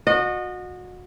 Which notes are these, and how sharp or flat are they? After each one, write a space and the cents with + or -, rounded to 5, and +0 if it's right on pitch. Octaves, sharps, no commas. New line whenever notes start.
F#4 -30 D#5 -25